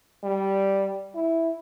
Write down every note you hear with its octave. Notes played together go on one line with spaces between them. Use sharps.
G3
E4